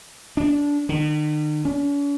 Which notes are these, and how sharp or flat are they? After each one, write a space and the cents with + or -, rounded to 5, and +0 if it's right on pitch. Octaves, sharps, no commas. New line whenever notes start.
D4 -20
D#3 -45
C#4 +45